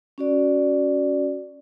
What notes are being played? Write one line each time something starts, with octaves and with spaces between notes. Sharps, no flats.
C#4 F#4 D5